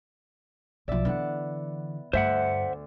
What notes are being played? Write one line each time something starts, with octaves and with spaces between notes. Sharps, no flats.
B1 F3 D5 E5
D3 E3 B3 F#5
D2 G2 C5 E5 F#5